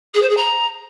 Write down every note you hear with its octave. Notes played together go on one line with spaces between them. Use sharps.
G#4
C5
G#4
A#5